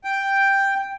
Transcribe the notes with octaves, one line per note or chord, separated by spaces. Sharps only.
G5